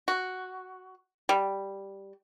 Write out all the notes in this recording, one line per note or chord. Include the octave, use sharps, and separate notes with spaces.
F#4
G3